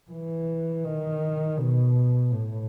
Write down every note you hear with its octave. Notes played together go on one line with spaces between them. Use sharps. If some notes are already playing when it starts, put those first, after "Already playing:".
E3
D#3
B2
A2